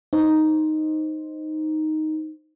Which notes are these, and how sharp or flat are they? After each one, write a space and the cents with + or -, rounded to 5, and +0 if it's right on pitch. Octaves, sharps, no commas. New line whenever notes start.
D#4 +0 C5 +0